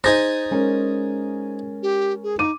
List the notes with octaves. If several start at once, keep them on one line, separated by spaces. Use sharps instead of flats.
D#4 G#4 C5 A6 A#6
G#3 C#4 A#4
G4
G#4
D#4 D6 D#7